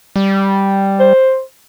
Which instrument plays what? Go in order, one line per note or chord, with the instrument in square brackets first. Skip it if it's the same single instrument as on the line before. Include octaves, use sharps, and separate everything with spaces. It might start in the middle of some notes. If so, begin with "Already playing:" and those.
[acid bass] G3
[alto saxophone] C5